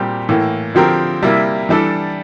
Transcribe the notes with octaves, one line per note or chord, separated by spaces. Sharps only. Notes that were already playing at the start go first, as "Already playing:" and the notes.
Already playing: A#2 G3 C4 G4
A2 E3 A#3
D3 F3 C4 G4 A#4
C3 G3 A#3 E4
E3 G3 D4 A4